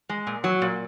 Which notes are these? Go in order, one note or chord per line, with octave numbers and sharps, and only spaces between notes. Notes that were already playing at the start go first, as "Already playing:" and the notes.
G#3
A#2
F#3
A#2